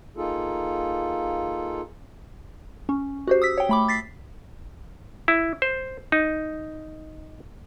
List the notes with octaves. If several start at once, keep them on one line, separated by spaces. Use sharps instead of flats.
A#3 D#4 F4 G#4 A4
C#4
F#4 G4 C5
D#6 E6 B6
C#5 G5
A3 B5 D6
A6 B6 C7
E4
C5
D#4